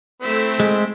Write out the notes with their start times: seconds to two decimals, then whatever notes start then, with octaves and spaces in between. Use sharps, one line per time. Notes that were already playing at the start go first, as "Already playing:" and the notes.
0.21 A3 C4 E4 E5
0.60 G#3